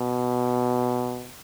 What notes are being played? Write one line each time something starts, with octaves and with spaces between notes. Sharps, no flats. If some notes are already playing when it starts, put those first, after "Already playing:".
Already playing: B2